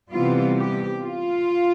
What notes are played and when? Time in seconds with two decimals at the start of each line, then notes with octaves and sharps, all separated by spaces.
0.11 C3 E3 G3 B3 F4
0.57 G4
1.02 F4